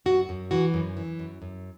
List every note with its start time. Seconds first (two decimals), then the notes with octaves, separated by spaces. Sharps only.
0.06 F#2 F#4
0.29 F#2
0.51 E3 F#4
0.74 F#2
0.97 E3
1.19 F#2
1.42 F#2